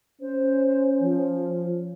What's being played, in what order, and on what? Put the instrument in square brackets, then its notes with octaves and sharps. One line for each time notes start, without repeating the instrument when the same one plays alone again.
[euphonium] C#4 [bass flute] C5
[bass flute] F3